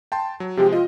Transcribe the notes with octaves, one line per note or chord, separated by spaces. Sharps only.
G5 A5 C6
F#3
C3 F3 G#3 G4
F4 D#5